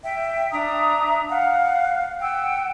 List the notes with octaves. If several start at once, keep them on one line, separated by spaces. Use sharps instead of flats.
E5 G5
D4 E5 A#5 D#6
F5 F#5
F#5 G5 E6